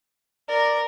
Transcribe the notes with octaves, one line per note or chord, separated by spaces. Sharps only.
A#4 D5